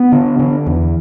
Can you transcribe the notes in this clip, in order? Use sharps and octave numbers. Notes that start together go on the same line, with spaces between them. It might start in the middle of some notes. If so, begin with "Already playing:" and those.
Already playing: B3
D3
D3
E2